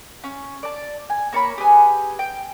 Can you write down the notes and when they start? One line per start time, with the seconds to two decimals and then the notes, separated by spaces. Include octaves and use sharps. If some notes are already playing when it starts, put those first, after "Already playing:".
0.24 C#4
0.63 D5 A5
1.10 G#5
1.33 A#3 C#5 A5 B5
1.58 G4 G#4 B4 G#5
2.19 G5